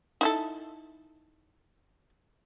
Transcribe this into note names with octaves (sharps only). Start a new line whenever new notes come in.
D#4 E4 A4